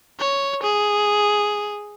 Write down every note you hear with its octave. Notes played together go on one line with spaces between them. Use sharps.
C#5
G#4